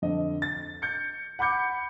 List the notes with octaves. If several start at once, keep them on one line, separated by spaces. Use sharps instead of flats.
F2 D3 D#5
A6
G6 C#7
F#5 B5 D6 G6 C#7